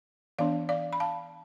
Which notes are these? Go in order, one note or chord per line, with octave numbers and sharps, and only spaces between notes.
E3 B3 D4 D5 F5
D5 F5
B5
F5 A5